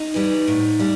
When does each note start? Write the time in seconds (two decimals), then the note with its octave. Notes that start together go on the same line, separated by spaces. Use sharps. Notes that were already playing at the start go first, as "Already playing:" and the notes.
Already playing: D#4
0.14 E3 G3
0.47 A2
0.79 G3